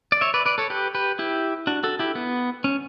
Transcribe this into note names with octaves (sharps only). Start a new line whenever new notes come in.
D5
C#5 E5
B4 D5
B4 D5
A4 C#5
G4 B4
G4 B4
E4 G4
D4 F#4
F#4 A4
E4 G4
B3
C#4